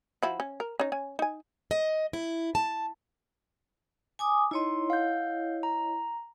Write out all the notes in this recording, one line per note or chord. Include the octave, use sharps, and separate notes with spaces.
F3 E4 F#4
C#4
A#4
C#4 D#4
C#4 G#5
D#4 G#5
D#5
E4
A5
G#5 D6 D#6
D#4 E4 C#5 D#5 C6
F5 F#5 G6
A#5